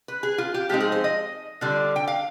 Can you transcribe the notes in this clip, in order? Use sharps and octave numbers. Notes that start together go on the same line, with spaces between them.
B4
G#4
F4
G4
F3 G#3 C4 D#4 G4
G#4
C5
D#5
D3 G3 D4 F4
G5
F5